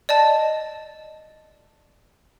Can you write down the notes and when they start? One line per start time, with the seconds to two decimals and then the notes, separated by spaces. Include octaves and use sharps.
0.09 D5 D#5 A5